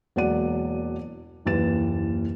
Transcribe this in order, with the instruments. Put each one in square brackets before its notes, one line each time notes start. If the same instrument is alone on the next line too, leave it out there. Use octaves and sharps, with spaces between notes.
[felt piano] E1 F#3 A#3 D5 F#5 D#7
F#1 D#2 E3 A6 E7